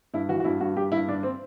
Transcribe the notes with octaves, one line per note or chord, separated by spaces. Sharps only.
G2 E4
E3 F#4
F#4
G2 E4
G2 F#4
G2 G4
G2 E4
G2 D4
C4